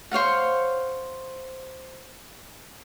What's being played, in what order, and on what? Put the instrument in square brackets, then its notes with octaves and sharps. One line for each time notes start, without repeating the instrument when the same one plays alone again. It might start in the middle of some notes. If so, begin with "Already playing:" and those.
[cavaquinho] C5 C#5 F5 F#5